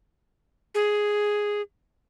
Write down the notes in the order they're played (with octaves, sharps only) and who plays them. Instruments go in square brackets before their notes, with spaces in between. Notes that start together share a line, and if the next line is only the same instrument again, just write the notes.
[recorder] G#4